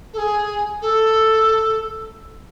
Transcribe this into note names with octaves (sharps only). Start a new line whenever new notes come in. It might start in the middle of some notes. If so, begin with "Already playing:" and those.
A4
G#4
A4